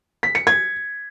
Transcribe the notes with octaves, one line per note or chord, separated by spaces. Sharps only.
B6
C#7
G#6